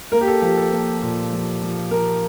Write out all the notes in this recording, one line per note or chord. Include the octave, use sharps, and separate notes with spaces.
A#3 A#4
G4
A4
F3 G4
A4
A#3
A#2
F3
F3
F3 A#4